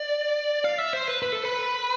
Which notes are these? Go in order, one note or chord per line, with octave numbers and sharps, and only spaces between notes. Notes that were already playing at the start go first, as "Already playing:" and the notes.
Already playing: D5
F5
E5
C5
B4
B4
A4
B4